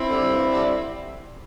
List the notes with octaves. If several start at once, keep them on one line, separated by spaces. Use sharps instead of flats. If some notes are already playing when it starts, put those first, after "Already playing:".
Already playing: C4 E4
D3 G3
G2
D3 G3